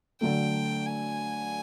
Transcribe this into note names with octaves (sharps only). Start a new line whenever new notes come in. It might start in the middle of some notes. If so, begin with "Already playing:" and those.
D3 F#3 A3 G5
G#5